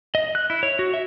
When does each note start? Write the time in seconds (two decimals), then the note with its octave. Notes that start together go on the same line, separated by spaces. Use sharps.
0.15 D#5
0.35 F#6
0.50 E4
0.63 C#5
0.79 F#4
0.94 E5